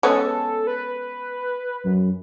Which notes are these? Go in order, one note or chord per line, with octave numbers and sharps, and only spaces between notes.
G#3 B3 C#4 A4
B4
F#2